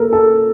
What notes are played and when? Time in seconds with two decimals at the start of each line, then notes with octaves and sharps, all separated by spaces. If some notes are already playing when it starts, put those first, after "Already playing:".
Already playing: A#3 A4 A#4
0.13 A4